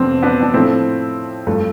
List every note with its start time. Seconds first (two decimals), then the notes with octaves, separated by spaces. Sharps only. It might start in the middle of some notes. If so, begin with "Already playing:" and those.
Already playing: F2 C3 F3 A3 B3 C4 D4
0.23 B3 D4
0.43 D4
0.53 A2 F3 A3 C4 E4
1.47 G2 F3 A3